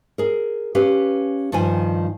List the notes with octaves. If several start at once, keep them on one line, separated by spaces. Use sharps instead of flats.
G#4 A#4
C#4 G4 B4 F5
G2 D#3 F3 D#4 G#5